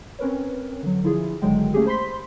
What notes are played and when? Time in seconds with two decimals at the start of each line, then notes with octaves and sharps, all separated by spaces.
0.19 C4 C#4 A#4 B4 C#5
0.83 D3 F#3
1.03 D3 F3 E4 F4 G#4
1.41 G1 D3 D#3 F#3 G#3 G5
1.74 A3 A#3 C#4 G4 G#4
1.86 C5 B5 C6 B6